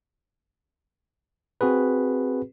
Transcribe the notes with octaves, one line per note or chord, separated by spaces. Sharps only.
C4 F#4 G#4 B4